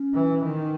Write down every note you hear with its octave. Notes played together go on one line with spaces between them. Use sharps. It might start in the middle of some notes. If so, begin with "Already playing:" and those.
Already playing: C#4
E3
D#3